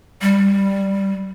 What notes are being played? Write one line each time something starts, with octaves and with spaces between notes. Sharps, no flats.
G3